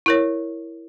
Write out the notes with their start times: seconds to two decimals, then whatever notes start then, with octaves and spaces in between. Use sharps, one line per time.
0.06 E4 A#4 C#5